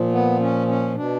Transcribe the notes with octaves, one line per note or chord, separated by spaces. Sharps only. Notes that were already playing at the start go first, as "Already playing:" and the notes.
Already playing: A#2 F3
B3
C#4
C#4
B2 D4